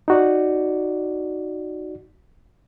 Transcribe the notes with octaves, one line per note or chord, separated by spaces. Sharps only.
D#4 F#4 D5